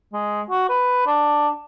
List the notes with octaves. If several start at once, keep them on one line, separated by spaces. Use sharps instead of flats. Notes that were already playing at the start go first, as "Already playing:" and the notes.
G#3
F#4
B4
D4